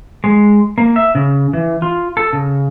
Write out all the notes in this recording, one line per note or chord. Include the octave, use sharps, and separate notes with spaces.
G#3
A#3
E5
C#3
E3
F4
A4
C#3